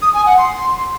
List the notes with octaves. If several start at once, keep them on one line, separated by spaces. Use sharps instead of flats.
D#6
G#5
F#5
C6